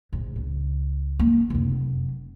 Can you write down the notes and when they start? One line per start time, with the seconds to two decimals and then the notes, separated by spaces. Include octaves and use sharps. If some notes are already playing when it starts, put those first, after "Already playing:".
0.13 A#1 A2
0.36 C#2
1.19 A#3
1.50 F1 F#2